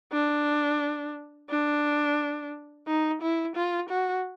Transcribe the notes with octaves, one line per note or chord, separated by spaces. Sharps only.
D4
D4
D#4
E4
F4
F#4